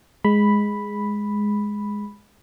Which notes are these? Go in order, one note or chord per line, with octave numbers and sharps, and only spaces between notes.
G#3 B5